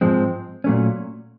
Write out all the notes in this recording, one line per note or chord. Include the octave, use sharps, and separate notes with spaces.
G#2 F3 G#3 C4
A#2 F#3 A3 C#4